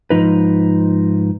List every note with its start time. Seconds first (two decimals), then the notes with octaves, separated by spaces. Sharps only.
0.10 G#2 D#3 F3 D#4 B4